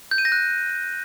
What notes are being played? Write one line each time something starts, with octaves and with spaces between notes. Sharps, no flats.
G6
D#7
A#6
F#6